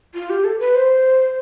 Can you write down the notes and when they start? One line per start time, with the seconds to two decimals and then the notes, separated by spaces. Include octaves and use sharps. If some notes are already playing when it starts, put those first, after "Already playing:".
0.14 F4
0.30 G4
0.44 A4
0.59 B4
0.75 C5